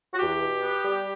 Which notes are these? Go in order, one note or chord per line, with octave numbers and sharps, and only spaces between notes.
F#4
E2 G4
B2
B3
G3